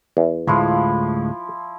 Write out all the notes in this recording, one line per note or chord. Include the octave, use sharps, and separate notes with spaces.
E2
D2 A2 F3 G#3 E4 F4